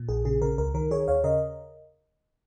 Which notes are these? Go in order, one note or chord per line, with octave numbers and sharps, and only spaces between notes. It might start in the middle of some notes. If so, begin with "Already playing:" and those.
Already playing: A#2
A#1 G#4
C#3 G#4
C#3 A#4
C#2 A#4
D#3 A#4
D#3 G#4 C#5
D#2 C#5 F5
C#3 A#4 D#5